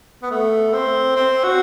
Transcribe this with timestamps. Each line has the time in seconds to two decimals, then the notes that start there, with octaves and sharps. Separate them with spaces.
0.23 B3
0.31 A3
0.74 C4
1.16 C4
1.44 F#4